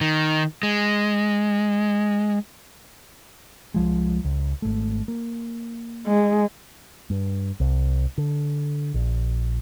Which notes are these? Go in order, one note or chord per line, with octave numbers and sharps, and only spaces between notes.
D#3
G#3
C2 F3 G#3
C#2
G#1 A3
A#3
G#3
G2
C2
D3
A#1